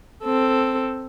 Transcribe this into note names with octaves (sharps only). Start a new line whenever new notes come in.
C4 A4